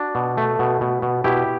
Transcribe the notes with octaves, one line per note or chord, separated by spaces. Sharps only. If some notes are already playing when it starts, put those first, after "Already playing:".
Already playing: D4 F#4
B2
A3
B2
B2
B2
B2 E4 G4